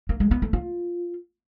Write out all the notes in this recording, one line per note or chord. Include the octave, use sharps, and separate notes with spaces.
A#3
G#3
B3
A3
F4